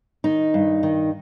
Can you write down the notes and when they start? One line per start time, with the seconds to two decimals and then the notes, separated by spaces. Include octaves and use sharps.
0.24 D#3 D#4
0.54 G2
0.83 D#3